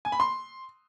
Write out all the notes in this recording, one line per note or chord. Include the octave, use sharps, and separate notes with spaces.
G#5
B5
C6